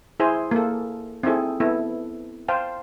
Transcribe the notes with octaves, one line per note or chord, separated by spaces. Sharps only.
E4 G#4 C5 G#5
A#3 G#4 A4
C4 D#4 E4 G#4 A4
B3 E4 A4
C5 F5 G5 A5